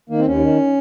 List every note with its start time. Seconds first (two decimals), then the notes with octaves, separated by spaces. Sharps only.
0.09 D#3 A#3
0.18 C4
0.26 D#2 C#4
0.42 D#3